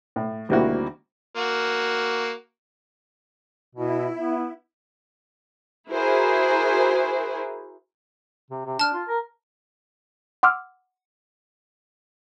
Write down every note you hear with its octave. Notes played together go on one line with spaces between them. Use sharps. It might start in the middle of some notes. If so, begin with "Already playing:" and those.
A2
G#1 D2 G3 A#3 E4 F#4
A#3 F#4
B2 E4
B3
E4 F#4 G#4 A#4 C5
C3
C3
D4 A5 F6
F4
A#4
F#5 C6 D6 E6 F6